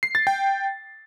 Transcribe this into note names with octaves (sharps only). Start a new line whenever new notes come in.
C7
A6
G5